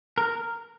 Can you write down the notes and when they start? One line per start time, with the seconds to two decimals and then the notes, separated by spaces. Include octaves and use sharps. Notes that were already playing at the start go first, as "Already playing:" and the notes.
0.18 A#4